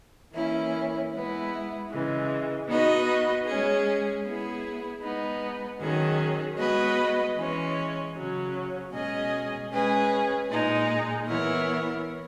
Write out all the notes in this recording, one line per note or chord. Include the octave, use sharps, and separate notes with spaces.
E3 A#3 C#4 E4
G#3 B3 E4
C#3 E3 G#3
B3 D#4 F#4 B4 D#5
G#3 C#4 G#4
B3 E4 G#4
G#3 B3 D#4
D#3 F#3 C#4 G#4
G#3 B3 F#4 B4 D#5
E3 G#3 C#4
C#3 F#3 C#4
B2 G#3 C#4 G#4 D#5
G#3 C#4 G#4 B4
A#2 G#3 D#4
E3 B3 E4 A#4 C#5